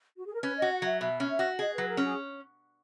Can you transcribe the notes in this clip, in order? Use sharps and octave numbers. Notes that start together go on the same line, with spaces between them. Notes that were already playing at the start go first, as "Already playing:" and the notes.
F#4
G#4
A#4
C#4 B4
F#4 D#5
F#5
F#3 E5
B2 E5
C#4
E5
F#4
G#4 D#5
F#3 B4
A#4
C#4
G#4